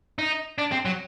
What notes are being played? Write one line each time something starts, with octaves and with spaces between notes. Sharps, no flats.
D#4
D4
C4
F#3